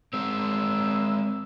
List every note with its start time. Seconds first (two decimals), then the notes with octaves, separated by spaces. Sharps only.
0.13 G#3 C4 E6